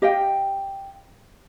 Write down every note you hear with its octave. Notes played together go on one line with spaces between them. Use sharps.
G4 D#5 F5 G5